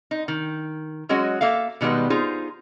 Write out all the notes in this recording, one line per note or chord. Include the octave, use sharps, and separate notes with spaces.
D#4
D#3
F#3 G#3 C#4 F#4 D#5
A#3 A4 E5 F5
B2 D#3 G3 G#3 B3
D#4 F4 G#4 C5